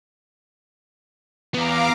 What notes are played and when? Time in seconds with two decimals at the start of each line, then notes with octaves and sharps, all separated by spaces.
1.54 E2 B3 F5 A#5 D6